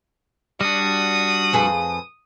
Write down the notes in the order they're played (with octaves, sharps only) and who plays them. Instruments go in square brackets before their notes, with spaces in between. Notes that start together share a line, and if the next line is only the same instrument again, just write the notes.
[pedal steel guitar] G3 D4 [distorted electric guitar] F#4 [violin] D#6
[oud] F2 G#4 B4